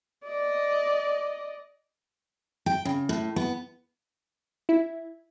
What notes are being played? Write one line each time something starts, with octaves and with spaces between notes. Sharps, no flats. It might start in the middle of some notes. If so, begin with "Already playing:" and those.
D5 D#5
G5
C#3
A2
B3
E4